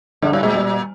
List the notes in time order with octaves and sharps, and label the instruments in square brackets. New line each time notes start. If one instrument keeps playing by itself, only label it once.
[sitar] G2 [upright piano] D3
[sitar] G#2 [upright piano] G3
[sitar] A#2 [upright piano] G#3
[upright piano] G3